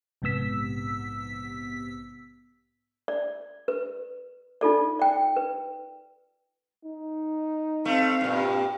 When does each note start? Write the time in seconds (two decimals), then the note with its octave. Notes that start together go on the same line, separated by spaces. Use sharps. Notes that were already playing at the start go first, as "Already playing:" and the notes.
0.22 A#1 G#2 C3 B3 E6 B6
3.08 D5
3.68 B4
4.61 D#4 F4 A4 D5
4.99 D5 G5
5.36 B4
6.85 D#4
7.85 A3 C4 F5
8.21 G2 A#2